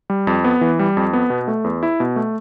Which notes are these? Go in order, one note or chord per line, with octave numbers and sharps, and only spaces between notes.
G3
F2
B3
E3
G3
F2
B3
B2
A3
E2
E4
B2
A3